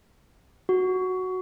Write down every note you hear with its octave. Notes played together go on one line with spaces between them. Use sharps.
F#4